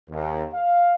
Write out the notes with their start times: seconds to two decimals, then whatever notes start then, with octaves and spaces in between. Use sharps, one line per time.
0.10 D#2
0.54 F5